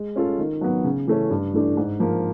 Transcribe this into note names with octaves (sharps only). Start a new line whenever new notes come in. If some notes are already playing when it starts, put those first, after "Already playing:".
Already playing: G#3
C#4 F4 A4
D#3
F#3 B3
C#3
E3 A3 C#4
G2
E3 A3 D4
G#2
F3 A#3